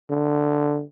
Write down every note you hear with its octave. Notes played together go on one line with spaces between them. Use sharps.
D3